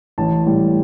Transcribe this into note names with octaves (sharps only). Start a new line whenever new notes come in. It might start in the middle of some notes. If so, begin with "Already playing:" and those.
A1 A5
A2 G3